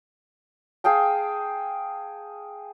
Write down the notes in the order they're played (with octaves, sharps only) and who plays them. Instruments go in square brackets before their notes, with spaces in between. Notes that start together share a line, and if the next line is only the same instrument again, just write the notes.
[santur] G#4 F5 G5 A5